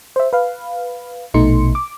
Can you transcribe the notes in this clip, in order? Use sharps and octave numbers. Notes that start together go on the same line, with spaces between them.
C5 E5
B4 F5
A#1 B2 A3 D#4 C6 C#7
D6